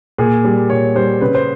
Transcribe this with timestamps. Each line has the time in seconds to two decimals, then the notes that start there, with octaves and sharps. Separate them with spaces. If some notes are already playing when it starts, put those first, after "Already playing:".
0.18 A#2 G#4
0.44 G3
0.69 A#2 C#5
0.95 G3 C5
1.21 C#3 B4
1.35 C5